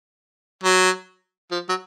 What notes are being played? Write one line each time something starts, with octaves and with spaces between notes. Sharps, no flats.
F#3
F3
F#3